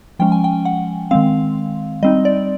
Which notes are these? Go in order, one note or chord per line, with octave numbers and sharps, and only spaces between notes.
F3 G#3 C#4 G5
G#5
G5
F#5
D#3 G#3 C4 F5
G3 C4 D#4 D#5
D5